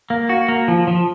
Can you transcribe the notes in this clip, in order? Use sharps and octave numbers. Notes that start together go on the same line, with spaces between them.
A#3
F#4
A#3
F3
F3